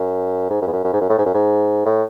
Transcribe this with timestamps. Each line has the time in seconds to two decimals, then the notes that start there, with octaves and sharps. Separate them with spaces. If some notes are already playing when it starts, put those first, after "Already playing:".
Already playing: F#2
0.50 G#2
0.61 F#2
0.67 E2
0.72 F#2
0.84 F#2
0.93 G#2
1.01 F#2
1.09 A2
1.18 G#2
1.26 F#2
1.34 G#2
1.85 A2